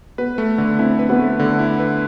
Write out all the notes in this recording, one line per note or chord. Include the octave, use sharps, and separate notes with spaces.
B3 B4
A3
D3
C4 E4
B4
B3
A3
D3
E4
B4